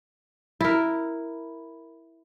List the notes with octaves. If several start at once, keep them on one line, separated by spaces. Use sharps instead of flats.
E4 A#4